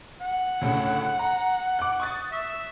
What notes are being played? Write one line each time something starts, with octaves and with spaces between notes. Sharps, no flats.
F#5
D2 A2 C#3
A#5
D6 F#6
C#6 D#6 A6
E5